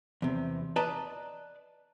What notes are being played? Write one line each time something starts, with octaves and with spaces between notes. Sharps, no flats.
E2 C3
B4 D5 D#5 A5 A#5